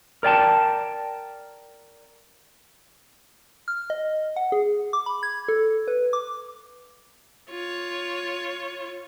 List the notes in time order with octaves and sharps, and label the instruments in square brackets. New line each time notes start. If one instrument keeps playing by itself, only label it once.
[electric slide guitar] A#4 D5 G5 A5
[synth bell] F6
D#5
F#5
G#4
D6
B5
G#6
A4
B4
D6
[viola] F4 C#5